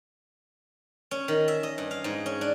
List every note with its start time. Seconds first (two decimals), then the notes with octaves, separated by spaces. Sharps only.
1.11 C#4
1.28 D#3
1.48 E5
1.63 D#5
1.78 G2
1.91 F5
2.04 G#2
2.26 C#4
2.41 D4